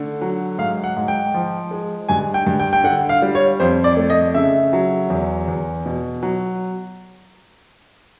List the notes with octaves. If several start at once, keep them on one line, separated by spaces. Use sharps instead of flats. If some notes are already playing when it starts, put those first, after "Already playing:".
Already playing: D3 A3
F#3
G#2 F5
F#5
G#2
G5
F3
G#3
G2 G#5
G5
G2
G5
G5
D3 F#5
F5
G3
C#5
F2 C5
D5
A3
D#5
C#3 E5
F#3
E2
E2
B2
F#3